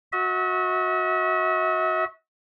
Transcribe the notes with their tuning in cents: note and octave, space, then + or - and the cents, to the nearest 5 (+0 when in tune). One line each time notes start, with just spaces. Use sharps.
F#4 -15 E5 -45